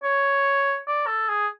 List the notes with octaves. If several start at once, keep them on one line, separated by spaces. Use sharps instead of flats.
C#5
D5
A4
G#4